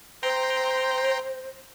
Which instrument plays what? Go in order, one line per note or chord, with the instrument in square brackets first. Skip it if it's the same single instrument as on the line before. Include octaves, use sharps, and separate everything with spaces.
[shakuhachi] C5 [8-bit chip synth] G5 A#5 C6